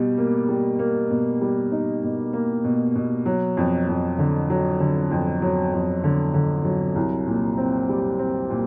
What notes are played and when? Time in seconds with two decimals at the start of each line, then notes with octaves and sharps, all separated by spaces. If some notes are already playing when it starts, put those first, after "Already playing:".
Already playing: B2 G3
0.18 A#3
0.49 G3
0.79 A#3
1.11 B2
1.41 G3
1.72 D#4
2.03 B2
2.33 A#3
2.64 B2
2.96 B2
3.26 F#3
3.57 F2
3.88 F2
4.19 D3
4.50 F#3
4.80 D3
5.11 F2
5.42 F#3
5.73 F2
6.04 D3
6.34 D3
6.65 F#3
6.96 C2
7.27 A#2
7.57 C4
7.89 G3
8.19 C4
8.50 A#2